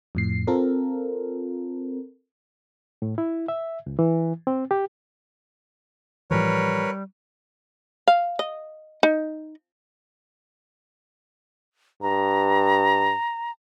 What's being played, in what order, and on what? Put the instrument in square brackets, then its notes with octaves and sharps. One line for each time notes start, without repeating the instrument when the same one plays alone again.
[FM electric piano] F2 A2 C7
C4 F4 A4 A#4
[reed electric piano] A2
E4
E5
C#2
E3
C4
G4
[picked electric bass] A2 E3 F3 [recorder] G3 [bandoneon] A#4 B4 C#5
[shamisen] F5
D#5
D#4
[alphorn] G2 [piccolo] A#5